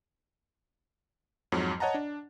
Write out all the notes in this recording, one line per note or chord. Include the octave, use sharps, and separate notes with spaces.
F2 G#2 F#3
C#5 D#5 F#5 A5 A#5
D4